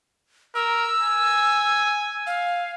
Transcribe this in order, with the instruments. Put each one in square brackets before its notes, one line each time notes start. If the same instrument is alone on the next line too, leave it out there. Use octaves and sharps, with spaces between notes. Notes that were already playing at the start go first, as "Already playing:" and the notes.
[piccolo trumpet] A#4 [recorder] E6
[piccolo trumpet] G#5
[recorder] F5